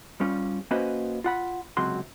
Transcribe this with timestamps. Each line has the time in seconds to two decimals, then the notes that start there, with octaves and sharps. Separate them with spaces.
0.20 G2 G3 C#4 F4
0.71 A#3 C#4 F#4 B4 C5 D#5
1.24 F4 F#5 B5
1.77 C#2 C3 F#3 F#4 C6